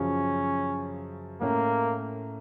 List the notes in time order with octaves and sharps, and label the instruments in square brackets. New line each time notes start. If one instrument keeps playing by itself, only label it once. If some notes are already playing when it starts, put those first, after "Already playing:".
Already playing: [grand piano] F#2 C#3 F3 [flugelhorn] C#4
[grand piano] A2 A3 C#4 [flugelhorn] A#3